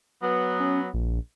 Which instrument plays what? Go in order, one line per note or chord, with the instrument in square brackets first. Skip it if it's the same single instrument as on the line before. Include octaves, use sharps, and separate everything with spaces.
[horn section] F#3 B3
[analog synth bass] C#4
A#1